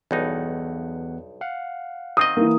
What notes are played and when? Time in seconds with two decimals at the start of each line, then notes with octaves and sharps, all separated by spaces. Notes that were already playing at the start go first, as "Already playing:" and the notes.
0.11 B1 E2 G2 D#4 F#5
1.41 F5 F#5
2.17 D#3 C4 D#5 D#6
2.37 E3 A#3